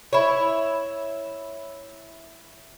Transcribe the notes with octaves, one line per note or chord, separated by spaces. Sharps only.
E4 C#5